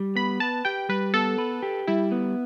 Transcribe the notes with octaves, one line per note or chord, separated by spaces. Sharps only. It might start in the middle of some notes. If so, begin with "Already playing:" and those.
Already playing: G3
B3 B5
B4 A5
G4 G5
G3 B4
B3 A4
B4
G4
G3 E4
B3